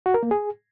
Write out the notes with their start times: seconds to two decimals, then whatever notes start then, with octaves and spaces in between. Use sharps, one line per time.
0.06 F#4
0.14 A#4
0.23 A#3
0.31 G#4